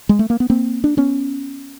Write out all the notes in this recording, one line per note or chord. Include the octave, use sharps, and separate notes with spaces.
G#3
A3
A#3
B3
A#3 C4
D4
B3 C#4